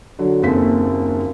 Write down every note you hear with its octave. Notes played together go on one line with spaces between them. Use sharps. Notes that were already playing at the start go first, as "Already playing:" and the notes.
D3 F#3
F#1 D#2 A3 C4 A4 B6